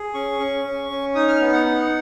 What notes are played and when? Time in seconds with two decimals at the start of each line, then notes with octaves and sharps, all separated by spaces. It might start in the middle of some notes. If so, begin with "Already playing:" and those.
Already playing: G#4
0.14 C#4 C#6
0.39 C#4
0.65 C#4
0.90 C#4
1.15 D#4 D#6
1.28 F6
1.40 B3
1.53 F#5
1.66 D#4